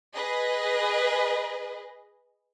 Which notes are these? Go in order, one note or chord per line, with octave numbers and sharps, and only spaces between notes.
G#4 B4 D#5